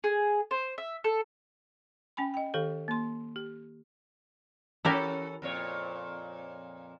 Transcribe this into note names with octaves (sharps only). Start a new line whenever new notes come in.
G#4
C5
E5
A4
C#4 G5 G#5 B5
D#5 G5
D#3 G4 A4 F5
A#3 C6
G4
E3 C#4 E4 G4 A4 A#4
F2 A#2 C#5